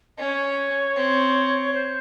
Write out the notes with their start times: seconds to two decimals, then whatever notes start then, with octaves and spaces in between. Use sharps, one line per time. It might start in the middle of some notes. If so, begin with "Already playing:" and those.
0.18 C#4 C#5 D#5
0.95 C4
1.74 C5